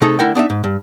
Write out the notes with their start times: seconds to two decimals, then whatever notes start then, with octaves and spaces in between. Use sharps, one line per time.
0.02 C3 A3 D#4 G#4 A4
0.19 D3 A3 E4 A#4 F#5 G5
0.35 B3 D4 D#4 E5
0.50 G#2
0.64 G2